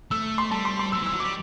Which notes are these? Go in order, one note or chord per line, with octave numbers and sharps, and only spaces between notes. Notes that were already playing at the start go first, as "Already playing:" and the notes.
A3 E6
C6
G3 A5
C6
C6
F#3 E6
E3 E6
F#3
D6
G3